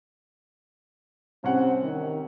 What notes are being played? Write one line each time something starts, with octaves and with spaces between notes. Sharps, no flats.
C2 C4 C#4 F#5
D#3